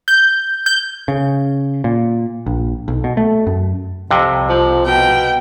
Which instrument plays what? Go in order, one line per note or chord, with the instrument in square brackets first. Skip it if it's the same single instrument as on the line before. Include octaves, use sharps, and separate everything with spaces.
[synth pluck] G6
G6
[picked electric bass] C#3
A#2
A#1
B1
B2
A3
F#2
[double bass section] C2 [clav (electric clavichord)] F2 C3
[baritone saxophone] F3
[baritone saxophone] B2 [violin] G5